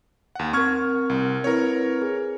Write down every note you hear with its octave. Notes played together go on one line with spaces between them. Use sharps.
D#2 F#5
C4 A#4 C#6 F6 G#6
C2
C4 E4 A#4 B4 C#5
G#4